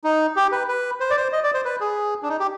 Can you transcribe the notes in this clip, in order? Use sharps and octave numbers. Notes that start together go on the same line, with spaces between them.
D#4
G4
B4
B4
C5
D5
C5
D#5
D5
C5
B4
G#4
D4
D#4
G4